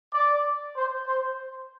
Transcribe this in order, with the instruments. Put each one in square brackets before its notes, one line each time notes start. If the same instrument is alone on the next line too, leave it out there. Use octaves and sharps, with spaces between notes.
[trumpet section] D5
C5
C5